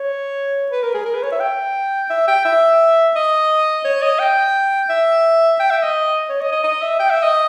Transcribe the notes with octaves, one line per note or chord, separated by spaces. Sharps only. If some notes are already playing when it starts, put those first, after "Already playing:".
Already playing: C#5
B4
A#4
G#4
A#4
B4
C#5
E5
G5
E5
G5
E5
D#5
C#5
D#5
G5
E5
G5
E5
D#5
C#5
D#5
D#5
D#5
E5
G5
E5
D#5